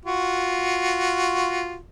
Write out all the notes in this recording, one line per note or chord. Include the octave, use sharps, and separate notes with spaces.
F4 F#4